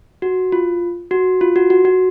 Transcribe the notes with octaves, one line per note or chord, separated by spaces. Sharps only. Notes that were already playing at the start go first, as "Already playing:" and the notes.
F#4
F4
F#4
F4
F#4
F#4
F#4